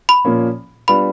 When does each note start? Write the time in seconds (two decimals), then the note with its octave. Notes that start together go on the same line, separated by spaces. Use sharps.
0.09 B5
0.25 A#2 F3 A#3 C#4
0.88 G3 B3 D4 F4 B5